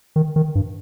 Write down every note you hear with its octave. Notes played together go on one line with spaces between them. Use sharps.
D#3
D#3
G2